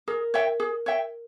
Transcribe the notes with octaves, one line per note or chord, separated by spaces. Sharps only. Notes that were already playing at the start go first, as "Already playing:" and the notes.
G#4 A#4
C#5 E5 G5
G#4
C#5 E5 G5